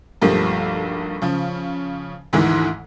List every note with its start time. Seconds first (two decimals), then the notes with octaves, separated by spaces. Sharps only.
0.21 B1 G2 F3 G3 A3 A#3
1.22 C#3 F3
2.33 D2 G#2 D#3 E3 G#3